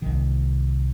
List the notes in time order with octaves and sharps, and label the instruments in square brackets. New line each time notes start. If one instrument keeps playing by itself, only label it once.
[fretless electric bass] C2 D#3